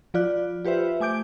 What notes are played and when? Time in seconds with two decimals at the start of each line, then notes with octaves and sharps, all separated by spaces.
0.14 F3 F4 D5 F#6
0.65 F4 G4 B4 C5 E5
1.00 A3 G#5 D6 G6 D7